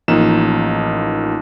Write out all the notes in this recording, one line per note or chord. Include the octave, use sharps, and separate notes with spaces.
A1 F3 A#3 D#4 E7